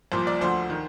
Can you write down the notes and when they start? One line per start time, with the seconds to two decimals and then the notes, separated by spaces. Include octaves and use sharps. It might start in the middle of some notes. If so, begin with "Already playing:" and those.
0.12 C2 A#2 F3 C5
0.27 D5
0.41 D2 D3 F3 C5
0.70 D#3